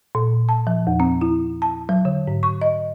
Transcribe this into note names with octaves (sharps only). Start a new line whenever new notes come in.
A#2
A5
F3
E2
C4
E4
A5
F#3
D3
G#2
C#6
D#5